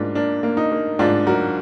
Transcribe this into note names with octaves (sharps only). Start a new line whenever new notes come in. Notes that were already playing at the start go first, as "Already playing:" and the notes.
Already playing: G#2 A#3 D4 F4
A#3 D4
A#3
D#4
A#3
G#2 D4 F4
F#3 F#4 A#4